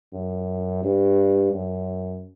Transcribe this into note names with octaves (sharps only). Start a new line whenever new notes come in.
F#2
G2
F#2